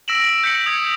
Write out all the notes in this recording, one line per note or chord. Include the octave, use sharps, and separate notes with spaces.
E6 A#6 B6 D7 E7 F#7
G6 B6 C#7 F#7
D#6 G#6